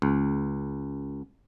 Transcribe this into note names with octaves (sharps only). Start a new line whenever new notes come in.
C#2